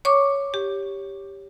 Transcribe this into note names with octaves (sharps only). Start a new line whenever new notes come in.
C#5 C#6 D6
G4